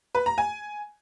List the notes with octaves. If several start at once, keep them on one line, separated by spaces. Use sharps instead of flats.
B4
A#5
G#5